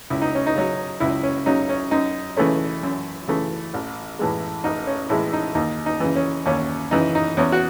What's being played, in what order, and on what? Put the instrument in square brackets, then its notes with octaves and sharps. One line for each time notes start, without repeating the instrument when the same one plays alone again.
[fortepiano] C#2 E4
D#4
C#4
D#4
C#3 F#3
C#2 E4
C#4
C#3 F#3 D#4
C#4
F#2 D#4
C#3 E3 A3 C#4
F#2
C#3 E3 A3
A1
A2 E3 G#3
A1 D#4
C#4
A2 E3 G#3 E4
D#4
D#2 D#4
D#4
C#3 E3
C#4
D#2 C#4
C#3 E3 D#4
D#4
E2 C#4
F#4